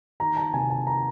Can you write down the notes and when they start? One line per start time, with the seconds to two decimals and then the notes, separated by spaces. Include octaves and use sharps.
0.20 D#3 A#5
0.37 A5
0.53 C3 G#5
0.70 A5
0.87 A#5